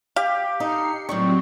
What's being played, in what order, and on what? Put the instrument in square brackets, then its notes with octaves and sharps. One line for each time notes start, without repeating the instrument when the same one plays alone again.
[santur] G4 [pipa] F5
[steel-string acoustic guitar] D#4 A4 A#4 [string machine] C7 C#7
[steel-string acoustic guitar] A2 D#3 G3 [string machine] F#3 C4 [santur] C#6